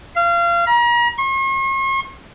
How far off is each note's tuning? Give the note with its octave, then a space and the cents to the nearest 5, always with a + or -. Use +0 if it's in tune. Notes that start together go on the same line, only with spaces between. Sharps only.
F5 -30
A#5 +40
C#6 -45